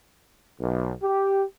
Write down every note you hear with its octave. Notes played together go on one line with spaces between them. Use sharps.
B1
G4